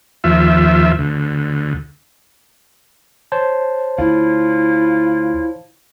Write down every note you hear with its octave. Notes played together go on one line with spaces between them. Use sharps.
D#2 F3 E5
D2
C5 C#5 A5
D2 E4 F4